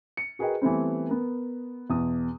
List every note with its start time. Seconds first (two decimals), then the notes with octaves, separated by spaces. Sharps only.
0.17 C#7
0.39 F#4 G#4 A#4 B4 D#5 G5
0.62 E3 G3 A3 B3 C4
1.09 B3 A#4
1.90 E2 B2 D#6